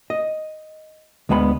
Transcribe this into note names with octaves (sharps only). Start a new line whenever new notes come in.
D#5
D2 G#3 B3 G#5 B5